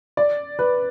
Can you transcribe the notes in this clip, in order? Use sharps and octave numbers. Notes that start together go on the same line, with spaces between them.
D5
B4